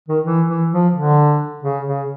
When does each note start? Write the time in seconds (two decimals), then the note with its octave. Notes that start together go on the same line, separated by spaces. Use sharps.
0.09 D#3
0.24 E3
0.48 E3
0.71 F3
0.93 D3
1.63 C#3
1.87 C#3